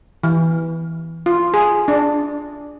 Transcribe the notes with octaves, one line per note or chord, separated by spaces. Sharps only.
E3
F4
G#4
D4